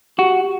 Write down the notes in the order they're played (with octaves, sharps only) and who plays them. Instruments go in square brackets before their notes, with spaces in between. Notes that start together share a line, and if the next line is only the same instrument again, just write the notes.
[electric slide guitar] F#4 [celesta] G4